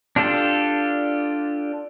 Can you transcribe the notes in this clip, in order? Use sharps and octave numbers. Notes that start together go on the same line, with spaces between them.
D4 F4 G4 A4